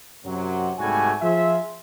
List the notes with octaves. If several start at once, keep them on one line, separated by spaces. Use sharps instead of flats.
F#2 C3 F#3
C2 G#2 G3 A3 F#4 G#5
F3 F4 G#4 E5